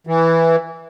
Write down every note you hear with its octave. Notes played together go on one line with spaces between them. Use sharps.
E3